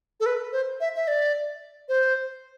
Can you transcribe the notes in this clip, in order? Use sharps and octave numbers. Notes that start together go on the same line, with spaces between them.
A4
B4
C5
E5
E5
D5
C5